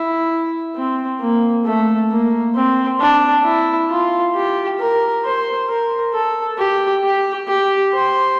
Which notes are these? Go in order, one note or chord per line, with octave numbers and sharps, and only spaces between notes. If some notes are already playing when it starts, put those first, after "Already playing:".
Already playing: E4
C4
A#3
A3
A#3
C4
D4
E4
F4
G4
A#4
C5
A#4
A4
G4
G4
G4
C5